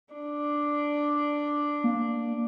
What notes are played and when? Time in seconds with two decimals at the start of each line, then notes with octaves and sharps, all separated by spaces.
0.15 D4
1.84 A#3